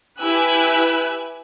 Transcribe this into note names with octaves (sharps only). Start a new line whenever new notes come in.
E4 G4 B4 G#5 E6 F#6